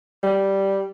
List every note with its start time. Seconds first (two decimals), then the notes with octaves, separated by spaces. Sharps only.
0.23 G3